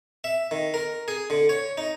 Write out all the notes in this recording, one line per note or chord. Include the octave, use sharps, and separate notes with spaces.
E5
D#3
A#4
G#4
D3
C#5
D#4